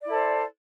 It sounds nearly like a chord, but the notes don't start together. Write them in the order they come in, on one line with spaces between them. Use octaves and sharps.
D5 E4 A4 C5